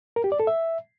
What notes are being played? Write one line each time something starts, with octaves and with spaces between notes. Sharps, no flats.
A#4
G4
D5
A4
E5